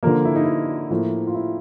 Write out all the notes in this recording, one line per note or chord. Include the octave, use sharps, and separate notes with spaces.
D3 F3 A#3 A#4
E4
D#4
E4
A2 F3 A#3
F4
E4